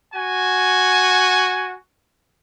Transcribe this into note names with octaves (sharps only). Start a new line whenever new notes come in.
F#4 G#5